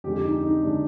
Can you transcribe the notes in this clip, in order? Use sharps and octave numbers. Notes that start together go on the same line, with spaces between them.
F2 D3 G#3 G4
D#4
D#4
D3 G#3 D4